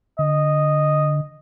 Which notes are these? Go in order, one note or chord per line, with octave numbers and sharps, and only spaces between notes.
D3 D#5